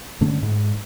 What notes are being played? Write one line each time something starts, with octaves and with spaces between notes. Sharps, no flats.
G2 D3 A3 C#4
G#2